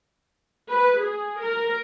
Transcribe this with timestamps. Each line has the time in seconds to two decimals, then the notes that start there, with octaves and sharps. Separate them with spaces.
0.70 B4
1.02 G#4
1.40 A#4